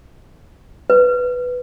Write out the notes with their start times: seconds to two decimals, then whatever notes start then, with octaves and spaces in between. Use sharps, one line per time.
0.90 B4